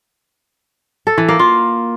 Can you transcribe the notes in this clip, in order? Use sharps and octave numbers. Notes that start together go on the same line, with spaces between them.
A4
E3
A#3
F4